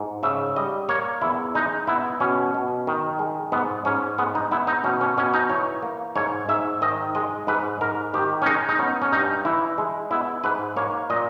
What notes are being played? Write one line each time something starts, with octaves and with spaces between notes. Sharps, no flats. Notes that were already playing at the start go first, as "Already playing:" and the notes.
Already playing: G#2
C#3 E5
G3 D#5
A#3 C#5
E2 E4
G#3 D#4
B3 E4
B2 C#4
B2
D#3
G#3
G#2 B3
G#2 C#4
G#3 B3
D#4
B3 E4
D#4
B2 C#4
C#4
B2 C#4
D#4
E3 C#5
A#3
G#2 C#5
G#2 E5
D#3 D#5
G#3 D#5
G#2 B4
G#2 A#4
D#3 G4
C#4
G#3 D#4
D#4
B3 C#4
C#4
G2 D#4
E3 E4
G#3
B3 E4
G#2 B4
A#3 C#5
A#2 D#5